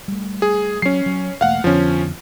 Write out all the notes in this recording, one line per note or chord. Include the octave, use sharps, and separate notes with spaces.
G3 A3
G#4
F#3 C#4 C7
F#3
E1 A3 A#3 F5 F#5
F2 D3 F3 B3 C#4